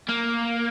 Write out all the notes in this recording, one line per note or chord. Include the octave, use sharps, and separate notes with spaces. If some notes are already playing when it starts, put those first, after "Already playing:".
A#3